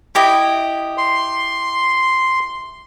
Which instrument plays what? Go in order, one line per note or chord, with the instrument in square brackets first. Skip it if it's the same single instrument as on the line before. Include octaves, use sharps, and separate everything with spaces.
[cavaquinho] E4 G4 D#5
[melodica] C6